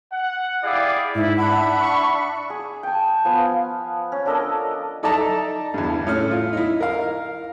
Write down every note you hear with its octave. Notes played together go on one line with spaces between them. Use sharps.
F#5
E4 G4 G#4 D5 E5 F5
G#2 E4
D4 E5 F#5 B5
C#6
G#4
G5 A5
F3 B3 G#5
F5
C#4
D4 A4 A#4 D#5
D#4 A4 D5 E5 A5 A#5
E2 G2
A2 C#4 F6
F4
D#4 E4
A#4 F5